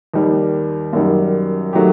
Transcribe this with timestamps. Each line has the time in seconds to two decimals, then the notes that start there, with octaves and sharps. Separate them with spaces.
0.14 D#2 D#3 G3
0.93 F#2 D#3 G3
1.73 D#3 F#3 A3 G4